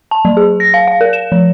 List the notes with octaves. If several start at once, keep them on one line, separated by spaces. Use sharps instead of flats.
A5
F#3
G#4
A#6
F5
F5
A#4
E7
F3